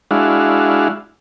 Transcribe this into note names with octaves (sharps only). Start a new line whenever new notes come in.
G#3 D4 E4 F#4 F5